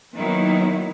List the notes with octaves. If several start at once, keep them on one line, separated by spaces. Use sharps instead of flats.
D#3 F#3 A#3 B3 D#4 E4